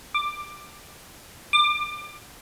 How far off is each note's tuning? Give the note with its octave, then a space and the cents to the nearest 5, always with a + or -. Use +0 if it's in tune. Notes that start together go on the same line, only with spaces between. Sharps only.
D6 +10
D6 +25